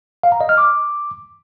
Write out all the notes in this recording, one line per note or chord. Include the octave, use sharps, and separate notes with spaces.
F5
A#5
D#5
F6
D6